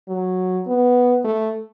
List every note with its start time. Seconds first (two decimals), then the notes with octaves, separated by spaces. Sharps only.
0.08 F#3
0.67 B3
1.24 A3